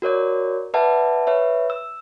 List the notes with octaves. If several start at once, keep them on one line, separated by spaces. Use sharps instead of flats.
F#4 A#4 C#5 D5
B4 D5 E5 F#5 A5
B4 C#5 E5
E6